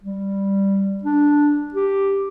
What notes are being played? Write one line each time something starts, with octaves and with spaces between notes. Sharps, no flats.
G3
D4
G4